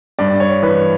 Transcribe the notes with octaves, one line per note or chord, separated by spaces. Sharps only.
G2 D5
C#5
E3 B4